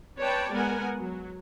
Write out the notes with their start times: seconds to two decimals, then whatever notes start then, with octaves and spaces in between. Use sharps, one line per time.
0.18 C4 B4 C#5 D5 G5 A5
0.53 G#3 B3 A#4 F#5 G#5
0.98 F#3